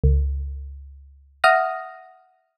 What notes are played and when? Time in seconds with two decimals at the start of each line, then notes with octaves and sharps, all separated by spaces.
0.04 C#2
1.44 E5 F#5 D#6 F6 A#6